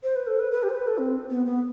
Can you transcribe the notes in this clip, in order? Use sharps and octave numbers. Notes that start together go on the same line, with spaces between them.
C5
B4
A4
B4
B4
G4
C5
B4
A4
C4
B3
B3